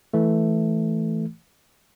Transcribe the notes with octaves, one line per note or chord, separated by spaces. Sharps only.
E3 A3